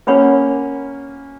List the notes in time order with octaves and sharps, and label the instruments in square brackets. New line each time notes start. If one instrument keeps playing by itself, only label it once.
[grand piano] A#3 C#4 [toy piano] A#4 C#5 F#5 B5